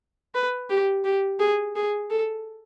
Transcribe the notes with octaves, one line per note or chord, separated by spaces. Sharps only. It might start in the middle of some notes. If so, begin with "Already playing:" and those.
B4
G4
G4
G#4
G#4
A4